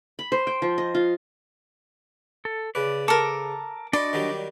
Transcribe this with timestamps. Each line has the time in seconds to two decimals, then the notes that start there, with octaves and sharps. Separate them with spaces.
0.19 B5
0.32 C5
0.47 G5
0.62 F3
0.78 D#5
0.95 F4
2.45 A4
2.75 C#3 B4 D5
3.08 A4 A#4 D6
3.93 D4 F#4 D5 D#5 B5 C6
4.13 D#3 F#3 G3